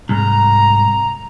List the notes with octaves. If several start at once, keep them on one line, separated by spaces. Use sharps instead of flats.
C2 G#2 A#5